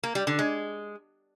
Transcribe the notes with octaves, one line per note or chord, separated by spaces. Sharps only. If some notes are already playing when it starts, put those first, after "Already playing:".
A#3
G3
D3
G#3